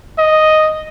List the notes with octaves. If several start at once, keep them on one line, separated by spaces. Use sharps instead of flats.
D#5